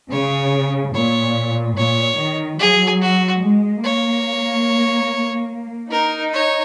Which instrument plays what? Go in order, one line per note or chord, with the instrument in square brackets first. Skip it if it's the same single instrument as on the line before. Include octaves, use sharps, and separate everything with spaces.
[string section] C#3 [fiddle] C#5
[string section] A#2 [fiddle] C#5
[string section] A#2 [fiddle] C#5
[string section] D#3
[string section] F#3 [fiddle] G#4
[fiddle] F#4
[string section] G#3
[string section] A#3 [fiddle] C#5
[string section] D#4 [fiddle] A#4
[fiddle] C#5